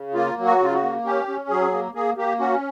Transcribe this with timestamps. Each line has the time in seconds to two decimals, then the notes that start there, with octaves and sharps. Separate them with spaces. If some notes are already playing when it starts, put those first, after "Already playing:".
Already playing: C#3
0.14 A#3 F4
0.38 F#3
0.45 F#4
0.60 C#3 F4
0.74 F#4
0.82 A#3
1.05 C#4 G4
1.28 C#4
1.49 F#3 G#4
1.72 A#3
1.94 A#3 G#4
2.17 A#3 G4
2.39 C#4 F#4